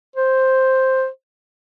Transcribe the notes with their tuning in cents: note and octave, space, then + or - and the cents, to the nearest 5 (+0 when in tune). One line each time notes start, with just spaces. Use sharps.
C5 +5